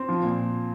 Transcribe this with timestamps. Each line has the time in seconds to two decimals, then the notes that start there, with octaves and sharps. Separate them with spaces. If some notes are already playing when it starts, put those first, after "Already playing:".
Already playing: C4
0.09 F3
0.23 A#2